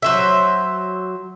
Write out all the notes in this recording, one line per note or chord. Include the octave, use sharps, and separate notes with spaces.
F#3 C5 E5